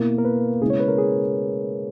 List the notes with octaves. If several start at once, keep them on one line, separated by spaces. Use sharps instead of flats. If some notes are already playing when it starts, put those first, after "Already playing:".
Already playing: B2 A#3 E4
A#4
B4
C#3 G#3 B3 E4 G#4
C#5
B4
A#4
G#4